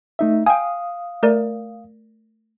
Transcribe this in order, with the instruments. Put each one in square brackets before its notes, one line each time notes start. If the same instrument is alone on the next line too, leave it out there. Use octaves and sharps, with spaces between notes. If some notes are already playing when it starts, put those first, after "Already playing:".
[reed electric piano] A3 D#4 E5
[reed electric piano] F5 D#6 [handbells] G5 G#5
[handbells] A3 A#4 D5